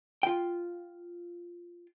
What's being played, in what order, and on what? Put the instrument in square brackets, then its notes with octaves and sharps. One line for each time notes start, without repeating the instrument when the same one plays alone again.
[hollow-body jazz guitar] F4 G5